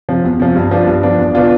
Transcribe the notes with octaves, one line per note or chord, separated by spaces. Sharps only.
C3 F3
E2
C3 F3
G2
F3 B3 D4
G2
F3 B3 D4
E2
B2 B3 D4 F4